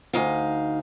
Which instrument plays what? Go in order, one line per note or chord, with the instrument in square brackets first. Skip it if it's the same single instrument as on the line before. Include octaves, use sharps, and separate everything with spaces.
[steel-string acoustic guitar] D2 D#4 F5